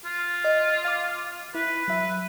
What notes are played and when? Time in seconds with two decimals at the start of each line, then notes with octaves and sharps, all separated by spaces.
0.05 F4
0.44 D#5
0.85 F5 D6
1.55 E4 B4
1.88 F#3 E5